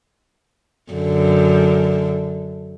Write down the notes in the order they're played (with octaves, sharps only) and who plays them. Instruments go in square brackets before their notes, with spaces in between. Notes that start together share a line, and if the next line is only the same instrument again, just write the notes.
[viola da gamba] F#2 D3